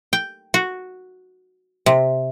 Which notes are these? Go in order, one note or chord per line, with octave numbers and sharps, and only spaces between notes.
G5
F#4
C3